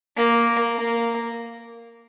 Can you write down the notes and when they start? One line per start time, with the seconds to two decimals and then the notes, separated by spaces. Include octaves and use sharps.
0.17 A#3
0.76 A#3